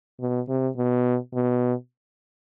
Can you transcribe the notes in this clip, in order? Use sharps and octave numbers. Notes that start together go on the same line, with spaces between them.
B2
C3
B2
B2